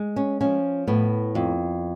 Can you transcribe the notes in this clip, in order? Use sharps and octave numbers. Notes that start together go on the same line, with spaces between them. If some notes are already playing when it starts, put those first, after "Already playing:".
Already playing: G#3
C#4
F3 C#4
A2 B3
F2